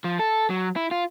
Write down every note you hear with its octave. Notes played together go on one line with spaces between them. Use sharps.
F3
A4
F#3
E4
F4